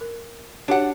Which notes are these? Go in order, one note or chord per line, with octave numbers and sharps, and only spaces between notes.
A#4
D4 F#4 G4 C#5 F#5